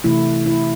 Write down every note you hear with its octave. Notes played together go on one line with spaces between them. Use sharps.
C3 E3 A3 E4
E4